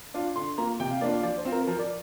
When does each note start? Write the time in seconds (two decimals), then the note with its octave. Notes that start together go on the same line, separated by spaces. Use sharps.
0.14 D4 F4
0.36 D3 C6
0.58 A#3 F4 A#5
0.80 C3 G5
0.91 F5
1.01 A#3 D4 F4 D5
1.13 F5
1.23 F3 D5
1.38 C5
1.45 C4 F4
1.52 A#4
1.67 F3 A#4
1.79 D5